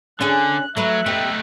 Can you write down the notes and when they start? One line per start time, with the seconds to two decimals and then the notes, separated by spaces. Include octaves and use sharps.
0.21 D3 C#4 D4 G#4 F#6
0.77 F#3 A3 B4 E5 F#6
1.06 A3 B3 D#4 G4 A4